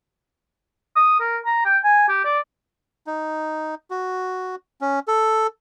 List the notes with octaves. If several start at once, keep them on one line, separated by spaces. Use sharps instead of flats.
D#6
A#4
A#5
G5
G#5
G4
D5
D#4
F#4
C#4
A4